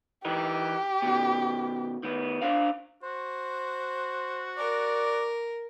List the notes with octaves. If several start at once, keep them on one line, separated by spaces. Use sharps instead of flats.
E3 D#4 G4 A#4
B2 D#3
D#3 B3
D4 C5 F5
F#4 C5
A#4 D5